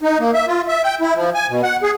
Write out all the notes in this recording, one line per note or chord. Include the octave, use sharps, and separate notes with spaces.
D#4
A#3
E5
F4
E5
G5
E4
F3
G#5
B2
F#5
G#4